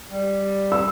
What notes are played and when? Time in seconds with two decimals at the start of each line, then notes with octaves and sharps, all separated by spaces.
0.12 G3
0.72 E6